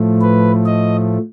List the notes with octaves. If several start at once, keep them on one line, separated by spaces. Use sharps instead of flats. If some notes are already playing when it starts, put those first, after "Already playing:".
Already playing: A2 F3 A3
B4
D#5